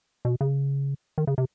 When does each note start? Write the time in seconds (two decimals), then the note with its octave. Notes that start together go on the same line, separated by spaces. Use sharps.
0.25 B2
0.41 C#3
1.18 D#3
1.27 C#3
1.38 C3